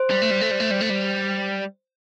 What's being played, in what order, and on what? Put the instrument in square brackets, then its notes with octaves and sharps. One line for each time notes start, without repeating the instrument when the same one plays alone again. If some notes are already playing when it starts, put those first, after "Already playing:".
Already playing: [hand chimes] C5
[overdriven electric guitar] G3
A3
G3
A3
G3
A3
G3
A3
G3